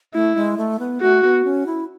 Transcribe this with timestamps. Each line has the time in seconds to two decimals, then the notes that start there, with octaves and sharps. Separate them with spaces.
0.14 A3 E4
0.36 G#3
0.58 A3
0.79 B3
1.02 A3 F#4
1.23 B3
1.45 C#4
1.66 E4